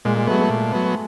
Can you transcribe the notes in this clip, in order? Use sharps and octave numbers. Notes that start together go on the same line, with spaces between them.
A#2 G#3
G#3
F#3 A3 B3
A3
A#2
F#3 B3